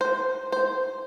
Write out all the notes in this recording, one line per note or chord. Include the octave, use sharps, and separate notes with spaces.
C5
C5